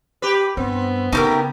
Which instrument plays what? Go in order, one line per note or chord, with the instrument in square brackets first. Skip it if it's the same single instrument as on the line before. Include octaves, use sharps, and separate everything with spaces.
[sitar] G4 B4
[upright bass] G2 [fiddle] B3 [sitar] C4
[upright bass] C#3 [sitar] A3 [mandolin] D#4 G4 A#4